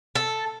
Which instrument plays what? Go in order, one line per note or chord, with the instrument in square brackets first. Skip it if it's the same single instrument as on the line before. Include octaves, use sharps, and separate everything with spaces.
[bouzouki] A4